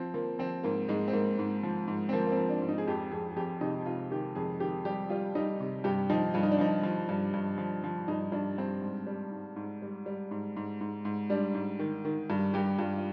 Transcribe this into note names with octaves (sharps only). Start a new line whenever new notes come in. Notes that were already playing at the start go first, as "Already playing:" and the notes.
Already playing: F3 C4
F3 A#3
F3 C4
G#2 A#3
G#2 G#3
C4
G#2 A#3
G#2
F3
G#2
C4
F3 A#3
A#3
C4
F3
D4
G#2
D#4
G#4
F2 G4
F2 G#4
G#4
F2 G4
C3 D#4
C3 F4
D#3 G4
F2 G#4
D#3 G4
G3 G4
G3 F4
G3 D#4
C3
G2 G4
F3 D#4
G2 F4
D#4
D4
F3 D#4
F3
G2
G2
F3
F3
G2 D#4
G2 D4
G2 C4
G#2
G3
G#2
G#2
G3
G3
G#2
G#2
G#2
G#2
G3 D4
G#2
D#3
D#3
G2
G2 G4
G2 F4
F4